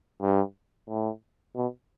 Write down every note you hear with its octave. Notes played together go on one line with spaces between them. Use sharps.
G2
A2
B2